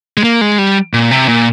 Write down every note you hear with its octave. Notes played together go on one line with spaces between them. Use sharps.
G#3
A#3
G#3
G3
A#2
C3
A#2